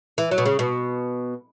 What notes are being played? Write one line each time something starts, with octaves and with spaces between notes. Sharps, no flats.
E3
F#3
B2
C#3
B2